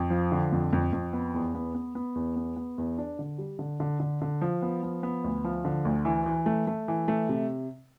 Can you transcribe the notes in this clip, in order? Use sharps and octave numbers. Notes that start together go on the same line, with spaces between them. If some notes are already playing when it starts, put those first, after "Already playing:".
Already playing: F2
F3
D3
F2
F2
F2
B3
E2
B3
B3
B3
E2
B3
B3
E2
D4
D3
G3
D3
D3
D3
D3
F3
B3
F3
B3
D2
F3
D3
D2
E3
E3
A3
A3
E3
A3
C3